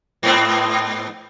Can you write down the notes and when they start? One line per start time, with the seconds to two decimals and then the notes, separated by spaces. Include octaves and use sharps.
0.23 G#2 B3 C4